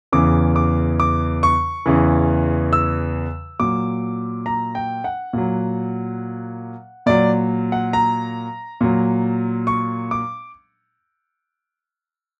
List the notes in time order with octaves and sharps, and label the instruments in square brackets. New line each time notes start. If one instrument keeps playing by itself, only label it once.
[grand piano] E2 C#3 E3 D6
D6
D6
C#6
E2 C#3 E3
E6
A#2 F#3 D6
A#5
G5
F#5
A#2 F#3
A#2 F#3 D5
F#5
A#5
A#2 F#3
C#6
D6